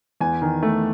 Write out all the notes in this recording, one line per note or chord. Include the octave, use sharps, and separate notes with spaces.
E2 G#5
D#3
A3